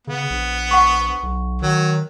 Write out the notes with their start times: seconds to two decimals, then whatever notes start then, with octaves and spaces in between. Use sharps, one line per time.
0.07 C#3 B3
0.30 A#1
0.71 F#5 C#6
1.23 B1
1.62 D#3 F#3